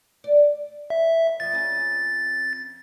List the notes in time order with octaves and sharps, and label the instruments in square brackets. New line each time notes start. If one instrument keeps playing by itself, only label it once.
[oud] D5
[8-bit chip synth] E5
[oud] F2 F3 [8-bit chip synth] A6
[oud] F2 C#4 G#4